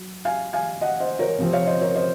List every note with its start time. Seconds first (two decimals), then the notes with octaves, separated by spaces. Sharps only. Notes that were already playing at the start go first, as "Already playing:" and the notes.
Already playing: F#3
0.25 F5 G#5
0.53 F5 G#5
0.81 D#5 F#5
1.00 C5 D#5
1.19 A#4 C#5
1.38 C3 F3 C4
1.53 C#5 F5
1.67 C5 D#5
1.81 A#4 C#5
1.95 C5 D#5